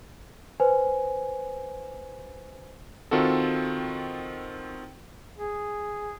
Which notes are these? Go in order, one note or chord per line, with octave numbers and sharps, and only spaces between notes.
B4 C5 G#5
D#3 C4 F4 F#4 A4
G#4